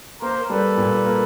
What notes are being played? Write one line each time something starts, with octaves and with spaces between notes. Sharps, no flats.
A#3 A#4 C5
G3 A4 B4
A#2
A#3